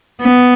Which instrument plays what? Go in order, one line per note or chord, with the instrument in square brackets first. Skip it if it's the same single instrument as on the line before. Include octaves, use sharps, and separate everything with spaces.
[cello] B3